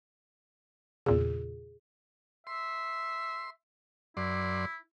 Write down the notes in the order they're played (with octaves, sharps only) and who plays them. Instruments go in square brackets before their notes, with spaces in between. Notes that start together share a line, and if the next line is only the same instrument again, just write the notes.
[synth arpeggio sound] E2 A#2 C#3 [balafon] G#4
[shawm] E5 [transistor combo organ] C6
[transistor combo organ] F#2 D5 C6 [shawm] E4